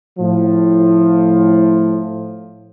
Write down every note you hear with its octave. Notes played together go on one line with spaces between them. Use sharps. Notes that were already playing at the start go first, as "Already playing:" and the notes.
A2 F3